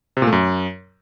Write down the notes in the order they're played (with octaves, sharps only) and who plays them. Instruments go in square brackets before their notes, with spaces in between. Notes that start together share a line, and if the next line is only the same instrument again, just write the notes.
[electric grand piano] C3
A#2
A3
F#2